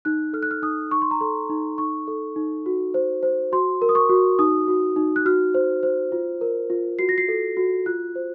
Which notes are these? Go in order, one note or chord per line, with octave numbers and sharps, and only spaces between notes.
D#4 F#6
A4 F6
F#6
F6
D#4 D#6
D#4 C#6
C6
A#5
A4 C6
D#4
D#4 C#6
A4
D#4
F#4
C5
C5
F#4 C6
A#4
D#6
C#6
F#4
D#4 D#6
F#4
D#4
F#6
F#4 F6
C5
C5
F4
A#4
F4
F#4 C7
A#6
C7
A4
F#4
F4 F#6
C5